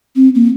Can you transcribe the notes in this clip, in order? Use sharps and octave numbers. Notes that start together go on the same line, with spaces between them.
C4
A#3